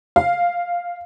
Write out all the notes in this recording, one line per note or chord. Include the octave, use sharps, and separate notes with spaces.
F5